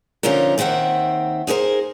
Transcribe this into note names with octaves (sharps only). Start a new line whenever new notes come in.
D3 F3 C#4 D#4 F4 A#4
D#2 D#3 C4 E5 F#5
D#4 G#4 A#4 C5